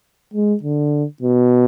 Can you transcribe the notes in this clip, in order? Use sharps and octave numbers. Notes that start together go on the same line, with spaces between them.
G#3
D3
B2